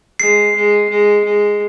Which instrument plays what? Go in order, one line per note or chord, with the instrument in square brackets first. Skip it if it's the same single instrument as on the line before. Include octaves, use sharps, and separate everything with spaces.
[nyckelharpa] G#3 [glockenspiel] C7
[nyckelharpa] G#3
G#3
G#3